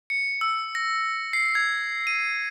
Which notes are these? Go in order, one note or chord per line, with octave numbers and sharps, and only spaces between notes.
C#7
E6
A#6
C7
G#6
D#7